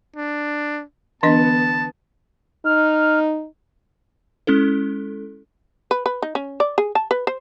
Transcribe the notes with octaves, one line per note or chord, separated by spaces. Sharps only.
D4
D3 E3 B3 D4 D#5 A5
D#4 F6
G#3 C#4 E4 A4
B4
B4
D#4
C#4
D5
G#4
A5
B4
C5